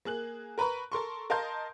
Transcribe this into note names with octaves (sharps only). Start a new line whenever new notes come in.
A#3 G#4 F#6 F#7
A#4 B4 A#5 B5 C#6
A4 A#4 C6 C#6
A#4 D#5 F5 A5 C6 G6